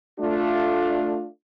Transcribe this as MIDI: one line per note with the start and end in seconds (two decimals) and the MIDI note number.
0.20 1.27 57
0.20 1.27 62
0.20 1.27 65